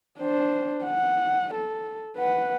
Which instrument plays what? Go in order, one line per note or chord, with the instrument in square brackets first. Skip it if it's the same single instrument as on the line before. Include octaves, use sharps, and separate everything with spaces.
[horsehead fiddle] D4 C5
F#5
A4
B4 F#5